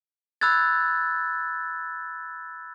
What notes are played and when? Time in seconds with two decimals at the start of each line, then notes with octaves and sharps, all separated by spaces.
0.41 B5 E6 F#6 G#6 A6